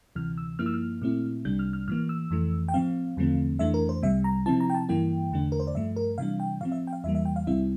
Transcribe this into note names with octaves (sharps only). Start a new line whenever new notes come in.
D2 C3 E3 F6
E6
G2 F3 A#3 E4 F6
E6
F6
A#2 A3 C4 E4
C2 C3 G3 D4 G6
F6
F6
A2 E3 A#3 F6
E6
F2 E3 A3
G5
A2 F3 C4 F5
E2 D3 F3 A3 C4
F2 E3 A3 D4 E5
A#4
C5
C2 C3 G3 E5
A#5
C3 F3 C4 E4 A5
A#5
G5
A5
G2 E3 A#3 E4 G5
E2 D3 A3 D4
A#4
C5
D5
G2 F3 A3 E5
A#4
C3 E3 G3 D4 F5
G5
A2 F3 C4 F5
E5
G5
F5
E2 E3 G3 A#3 E5
E5
G5
F5
C2 C3 G3 C4 E4 E5